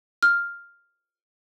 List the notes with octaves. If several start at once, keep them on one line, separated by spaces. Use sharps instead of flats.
F6